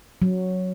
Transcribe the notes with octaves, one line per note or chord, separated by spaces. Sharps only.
F#3